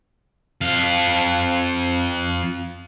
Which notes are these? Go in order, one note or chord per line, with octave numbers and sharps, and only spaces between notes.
F2 F5